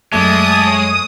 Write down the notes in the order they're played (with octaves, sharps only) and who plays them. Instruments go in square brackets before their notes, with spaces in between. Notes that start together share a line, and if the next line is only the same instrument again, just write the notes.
[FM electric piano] F#2 A3 C#6 [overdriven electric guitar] G#3 [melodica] D5 E5 A5 [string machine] D#6
[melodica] C#5